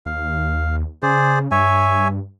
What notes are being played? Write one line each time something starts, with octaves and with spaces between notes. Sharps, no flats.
D#2 F5
C#3 G#4 C5 D5
G2 C#5 E5 G#5